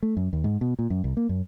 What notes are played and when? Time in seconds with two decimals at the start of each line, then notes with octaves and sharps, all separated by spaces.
0.03 A3
0.17 F#2
0.33 D#2
0.44 G#2
0.61 B2
0.79 A#2
0.90 F#2
1.04 C2
1.17 A#3
1.29 F#2